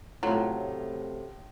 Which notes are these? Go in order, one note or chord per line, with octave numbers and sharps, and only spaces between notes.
A2 C3 F#3 A3 C#4 F4